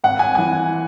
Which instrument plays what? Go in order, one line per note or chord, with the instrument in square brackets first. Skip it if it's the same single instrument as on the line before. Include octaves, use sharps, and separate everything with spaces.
[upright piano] G#1 F#5
G#5
E3 G#5